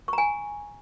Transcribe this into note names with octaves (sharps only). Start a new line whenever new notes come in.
G#5 A#5 C#6